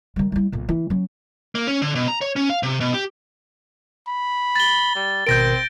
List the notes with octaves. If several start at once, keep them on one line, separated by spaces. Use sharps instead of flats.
D#3 G3
G3 E4
B1 A#2
E3
F#3 C#4
A#3
C#4
D3
B2
A#5
C#5
C#4
F5
C3
B2
G4
B5
A6 G7
G3
G#1 B2 C4 A#4 G6 A#6 D7